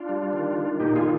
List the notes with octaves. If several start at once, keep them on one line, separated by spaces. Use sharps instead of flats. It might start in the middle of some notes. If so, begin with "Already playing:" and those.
Already playing: D4 F4
G3
D#3
D#3
A#2 D#4 G4
F4 G#4